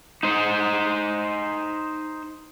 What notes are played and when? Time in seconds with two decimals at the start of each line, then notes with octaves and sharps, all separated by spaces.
0.23 D#4 C5